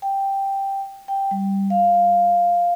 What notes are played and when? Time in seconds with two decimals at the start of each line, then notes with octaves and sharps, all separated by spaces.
0.02 G5
1.08 G5
1.31 G3
1.70 F5